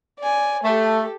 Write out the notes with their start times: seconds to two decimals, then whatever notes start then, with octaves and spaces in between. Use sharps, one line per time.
0.19 D5 G#5
0.63 A3 G4 A4